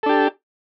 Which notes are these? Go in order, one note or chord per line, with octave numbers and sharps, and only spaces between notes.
D4 G4 A4